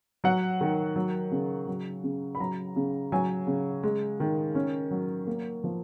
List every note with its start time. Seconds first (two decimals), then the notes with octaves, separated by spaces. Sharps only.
0.24 F#3 F#5
0.61 D#3
0.96 F#3
1.32 C#3
1.67 F#3
2.03 C#3
2.35 B5
2.40 F#3 A#5
2.76 C#3
3.12 F#3 G#5
3.47 C#3
3.83 G#3
4.20 D#3
4.55 C#4
4.91 F#3
5.27 A#3
5.64 F3